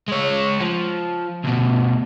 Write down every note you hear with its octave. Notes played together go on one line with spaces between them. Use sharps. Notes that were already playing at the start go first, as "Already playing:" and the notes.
G#3 C#5
F3
D2 B2